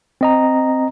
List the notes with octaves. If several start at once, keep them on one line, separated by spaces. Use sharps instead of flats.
C4 D#5 A#5